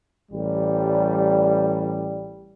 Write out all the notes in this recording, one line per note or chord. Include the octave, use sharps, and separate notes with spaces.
A1 G3